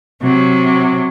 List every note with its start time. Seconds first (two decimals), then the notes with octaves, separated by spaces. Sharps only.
0.22 C3 F#3